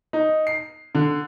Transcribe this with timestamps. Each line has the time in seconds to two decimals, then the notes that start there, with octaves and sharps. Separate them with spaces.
0.13 D#4
0.47 C7
0.95 D3